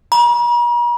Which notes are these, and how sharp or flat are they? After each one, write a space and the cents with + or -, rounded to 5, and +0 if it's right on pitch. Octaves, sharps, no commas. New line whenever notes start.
A#5 +45